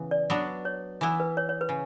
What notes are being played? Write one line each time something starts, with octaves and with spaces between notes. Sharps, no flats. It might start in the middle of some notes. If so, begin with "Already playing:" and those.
Already playing: C#3 E3 B3
D5
F#3 B3 D4
C#5
E3 B3 E4
B4
C#5
C#5
B4
C#3